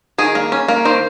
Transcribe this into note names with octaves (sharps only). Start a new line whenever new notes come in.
D#3 G#4
A#3
C#4
A#3
D#3 C5